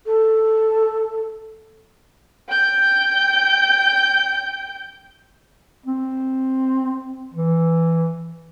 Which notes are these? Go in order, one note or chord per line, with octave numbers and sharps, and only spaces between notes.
A4
G5 G6
C4
E3